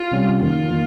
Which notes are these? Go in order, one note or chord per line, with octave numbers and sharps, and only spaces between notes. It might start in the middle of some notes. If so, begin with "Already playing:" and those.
Already playing: F4
C3 G3 C#4 G4
F2 D#3 A#3 F4
D#3 A#3